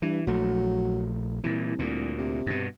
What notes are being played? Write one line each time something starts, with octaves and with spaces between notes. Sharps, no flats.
G2 E3
A#1 F#3 A3
C2 A#2 E3
D2 A#2
C3
G2 B2